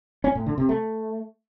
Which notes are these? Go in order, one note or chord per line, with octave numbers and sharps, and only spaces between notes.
C#4
A2
D3
C3
A3